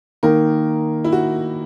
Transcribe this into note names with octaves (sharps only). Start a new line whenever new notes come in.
D#3 A#3 D#4 A#4
E4
F#4